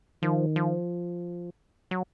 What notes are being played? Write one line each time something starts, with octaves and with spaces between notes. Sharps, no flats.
D#3 F3
F3
F#3